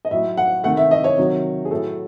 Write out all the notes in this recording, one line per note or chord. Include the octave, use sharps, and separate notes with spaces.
D#5
A2 F#3 A3 E5
F#5
C3 D#3 A3 F#5
E5
D#5
C#5
C3 D#3 F#3
G#4
A2 F#3 A3 A4